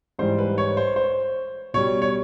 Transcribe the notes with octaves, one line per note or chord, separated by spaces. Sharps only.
G#2 E3 G3 C5
B4
C#5
C5
C5
B2 G3 C#5
C#5